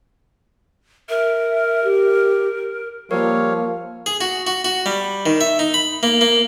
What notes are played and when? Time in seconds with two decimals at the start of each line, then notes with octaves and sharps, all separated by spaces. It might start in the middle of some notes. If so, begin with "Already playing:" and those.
1.09 A#4 E5
1.84 G4
3.11 F3 G3 A#3 A#4 C#5 F5
4.06 G#4
4.21 F#4
4.47 F#4
4.65 F#4
4.86 G3
5.26 D#3
5.41 E5
5.59 D#4
5.74 B5
6.03 A#3
6.21 A#3